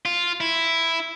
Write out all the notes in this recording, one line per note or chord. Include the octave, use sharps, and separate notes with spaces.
F4
E4